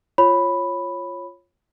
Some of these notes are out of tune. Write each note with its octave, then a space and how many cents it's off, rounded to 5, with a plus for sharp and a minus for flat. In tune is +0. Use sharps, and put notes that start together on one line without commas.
F4 +0 C#5 -15 B5 +0